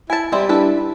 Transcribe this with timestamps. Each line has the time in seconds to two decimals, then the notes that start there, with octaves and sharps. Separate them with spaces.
0.10 E4 G#5 A5
0.32 G3 G#3 C4 E4 D5
0.49 D4 E4 A4 B4